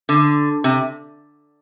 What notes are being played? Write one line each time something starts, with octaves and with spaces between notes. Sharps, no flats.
D3
C3